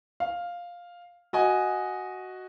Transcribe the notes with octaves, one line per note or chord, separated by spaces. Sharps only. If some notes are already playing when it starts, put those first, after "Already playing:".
F5
F#4 D#5 G#5